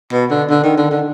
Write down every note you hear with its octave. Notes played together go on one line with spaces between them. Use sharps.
B2
D3
D3
D#3
D3
D3